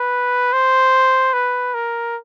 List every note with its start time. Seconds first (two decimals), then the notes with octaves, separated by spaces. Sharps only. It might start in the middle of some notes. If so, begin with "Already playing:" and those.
Already playing: B4
0.53 C5
1.33 B4
1.74 A#4